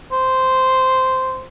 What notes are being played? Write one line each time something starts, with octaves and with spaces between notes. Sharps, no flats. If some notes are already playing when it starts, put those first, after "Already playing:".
C5